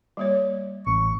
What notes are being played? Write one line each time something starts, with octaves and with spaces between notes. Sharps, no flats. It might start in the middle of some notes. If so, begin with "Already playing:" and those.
G3 A#3 C#5
A1 C#6